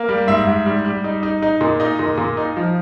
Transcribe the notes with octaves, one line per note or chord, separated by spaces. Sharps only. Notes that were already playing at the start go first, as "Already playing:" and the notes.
Already playing: A#3
G3
G#2 E5
G#2
G3
G3
D#4
D#4
D#4
A#2
D#4 D#5
A#2
A#2
D#4
F3